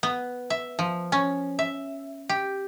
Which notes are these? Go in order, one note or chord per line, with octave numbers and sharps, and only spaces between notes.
B3
E5
F3
C#4
E5
G4